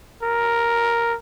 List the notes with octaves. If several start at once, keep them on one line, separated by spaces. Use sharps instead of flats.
A#4